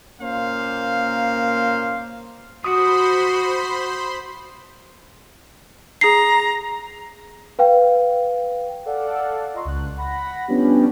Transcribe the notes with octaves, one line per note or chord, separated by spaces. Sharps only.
A#2 A#3 C#4 C5 F5
F#4 C5 B5 C6 D#6
G#4 A#5 C7
B4 F5 G5
A4 D5 F5 F#5
F4 D#5 A#5 C6 C#6
C#2 F#6
F#5 B5 A#6
F3 G3 B3 C#4 D4 G4